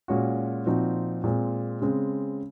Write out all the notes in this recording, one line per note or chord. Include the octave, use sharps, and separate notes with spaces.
A#2 G#3 C#4 F#4
A#2 F3 C4 D#4 F#4
A#2 G#3 C4
C#3 G#3 C4